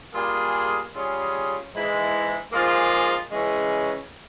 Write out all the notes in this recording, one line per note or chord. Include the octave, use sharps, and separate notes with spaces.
G3 A#3 F4 G#4
G3 C#4 F4 G#4
G#2 E3 G#3 E4
G#2 F3 A#3 F4 G#4
C#3 E3 G#3 C#4